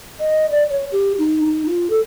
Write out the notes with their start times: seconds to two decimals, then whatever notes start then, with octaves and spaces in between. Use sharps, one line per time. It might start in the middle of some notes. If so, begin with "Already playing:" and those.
0.20 D#5
0.51 D5
0.70 C#5
0.92 G4
1.18 D#4
1.45 D#4
1.67 F4
1.90 A4